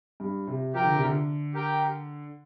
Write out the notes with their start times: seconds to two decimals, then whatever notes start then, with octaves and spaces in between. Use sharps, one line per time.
0.20 G2
0.47 C3
0.73 F3 G4 A#4 G5
0.84 D3
0.95 C3
1.04 D3
1.54 G4 A#4 G5